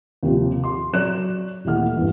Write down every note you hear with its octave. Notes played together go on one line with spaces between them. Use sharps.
D#2 C3 F3
C6
F#3 C#5 D5 F#6 E7
D#1 E3 A3 F#5 F6
E2 G2